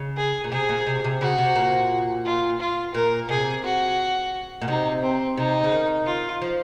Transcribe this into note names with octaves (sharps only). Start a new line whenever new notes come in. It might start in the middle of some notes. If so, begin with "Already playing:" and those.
Already playing: C#3
G#4
A#2
C3 G#4
A#2
C3
C3
C#3 F#4
C3
A#2
F4
F4
A#2 A#4
C3 G#4
F#4
A#2
C3 D#4
C4
C3 D#4
C#3
D#3
F4
F3